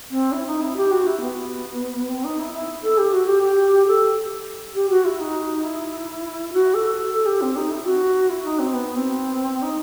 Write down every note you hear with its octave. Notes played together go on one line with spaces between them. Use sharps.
C4
E4
D#4
E4
G4
F#4
E4
B3
C4
D#4
E4
E4
A4
G4
F#4
G4
G4
A4
G4
F#4
E4
D#4
E4
F#4
A4
A4
G4
C4
D#4
E4
F#4
E4
D#4
C4
B3
C4
D#4